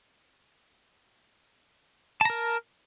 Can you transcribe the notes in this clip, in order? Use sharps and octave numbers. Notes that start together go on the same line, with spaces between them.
A#4 A5 A#5